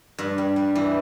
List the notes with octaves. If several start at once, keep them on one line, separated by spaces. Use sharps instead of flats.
G2
G3
G3
E3